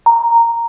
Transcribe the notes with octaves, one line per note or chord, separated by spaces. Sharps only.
A#5